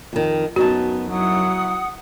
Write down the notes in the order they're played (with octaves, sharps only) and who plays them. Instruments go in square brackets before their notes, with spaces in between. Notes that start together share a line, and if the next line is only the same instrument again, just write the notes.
[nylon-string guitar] F2 D#3
[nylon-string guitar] F#2 D#4 A5 [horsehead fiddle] B3 [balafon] F#4
[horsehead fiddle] F#3 E4 [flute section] F#5 D#6